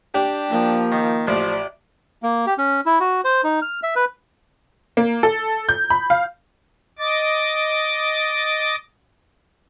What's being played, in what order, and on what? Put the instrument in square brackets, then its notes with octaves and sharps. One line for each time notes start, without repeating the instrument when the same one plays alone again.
[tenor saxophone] D4 [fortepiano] G4
[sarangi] F3 [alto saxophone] A#3
[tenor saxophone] D#3
[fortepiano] A1 [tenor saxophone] F3 [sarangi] D5
[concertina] A#3
G4
C#4
E4
F#4
C5
D#4
F6
E5
B4
[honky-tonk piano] A#3
A4
G6
B5
F5
[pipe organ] D#5 D6 A6